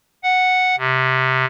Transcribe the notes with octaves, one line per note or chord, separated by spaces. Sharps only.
F#5
C3